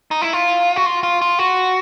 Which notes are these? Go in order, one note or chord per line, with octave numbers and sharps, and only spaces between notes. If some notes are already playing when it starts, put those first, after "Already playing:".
D#4
E4
F4
F#4
F4
F4
F4
F#4